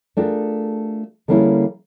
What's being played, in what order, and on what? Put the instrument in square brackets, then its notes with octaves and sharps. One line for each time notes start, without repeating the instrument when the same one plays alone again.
[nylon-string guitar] A3 D4 F4 G4 G#4 A#4
D3 G3 A#3 C#4 E4 G#4